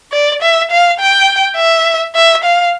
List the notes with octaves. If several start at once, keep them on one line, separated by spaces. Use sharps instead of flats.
D5
E5
F5
G5
E5
E5
F5